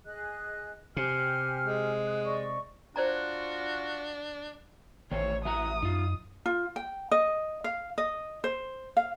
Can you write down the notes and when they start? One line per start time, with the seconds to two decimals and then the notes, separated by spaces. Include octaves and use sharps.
0.06 G#4 D#5 F#6
0.97 C3 G4 G#5 F6
1.64 G#3
2.07 D#6 F#6
2.24 D5 D#5 C#6
2.96 D4 F4 F#4 C5 D5 A#5
5.11 A1 D#3 A3 C5 C#5
5.45 E3 F#4 E5 A#5 D#6
5.83 F#2 D#4 F4
6.46 F4
6.76 G5
7.11 D#5
7.64 F5
7.98 D#5
8.44 C5
8.97 F5